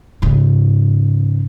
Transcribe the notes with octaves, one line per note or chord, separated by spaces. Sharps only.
G#2 C#3